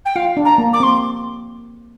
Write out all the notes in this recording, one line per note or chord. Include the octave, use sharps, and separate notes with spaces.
G5
F4 F5
D4
A#5
A#3
D6
C4 C6